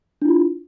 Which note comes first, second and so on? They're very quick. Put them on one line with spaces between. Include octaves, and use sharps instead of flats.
D4 E4 F4